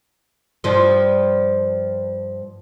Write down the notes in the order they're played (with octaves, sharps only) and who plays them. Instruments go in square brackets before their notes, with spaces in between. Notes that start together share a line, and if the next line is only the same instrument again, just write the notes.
[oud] G2 F3